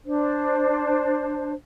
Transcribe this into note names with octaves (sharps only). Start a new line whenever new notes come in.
D4 C5